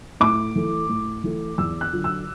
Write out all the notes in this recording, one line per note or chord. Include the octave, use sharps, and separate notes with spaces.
A2 D6
E3 A3
A2
E3 A3
E2 E6
F#6
D3 F#3
E6